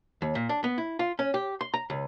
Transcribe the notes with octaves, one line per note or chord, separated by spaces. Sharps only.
D#2
A#2
D4
B3
E4
F4
C#4
G4
C6
A#5
C#2